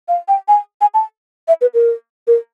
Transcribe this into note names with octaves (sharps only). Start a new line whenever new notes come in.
F5
G5
G#5
G#5
A5
E5
B4
A#4
A#4